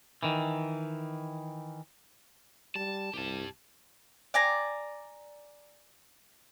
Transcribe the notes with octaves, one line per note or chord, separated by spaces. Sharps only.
D#3 E3
G3 A5
C2 G4 A5
D5 G#5 A#5